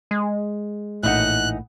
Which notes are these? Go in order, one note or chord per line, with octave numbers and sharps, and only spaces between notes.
G#3
A#1 A2 E3 D#4 F#5 F#6